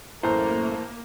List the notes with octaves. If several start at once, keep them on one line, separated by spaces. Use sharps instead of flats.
F#2 A2 E3 A3 A#3 C5 A#5